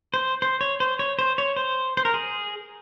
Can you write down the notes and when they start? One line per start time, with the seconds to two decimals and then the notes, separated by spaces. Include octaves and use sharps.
0.14 C5
0.42 C5
0.61 C#5
0.80 C5
0.99 C#5
1.19 C5
1.38 C#5
1.56 C5
1.97 C5
2.05 A#4
2.14 G#4